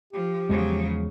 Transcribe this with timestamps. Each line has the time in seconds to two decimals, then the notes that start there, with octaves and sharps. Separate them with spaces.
0.13 F3 G4
0.49 E2 C#3 F3 F#3 G#3